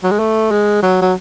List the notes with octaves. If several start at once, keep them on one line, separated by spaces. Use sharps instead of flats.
F#3
G#3
A3
G#3
F#3
F#3